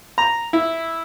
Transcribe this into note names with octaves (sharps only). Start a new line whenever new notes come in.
A#5
E4